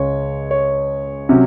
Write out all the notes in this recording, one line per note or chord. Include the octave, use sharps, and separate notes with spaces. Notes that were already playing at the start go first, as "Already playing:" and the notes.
Already playing: C#2 C#3 G#3 C#5
C#5
C3 F#3 C#4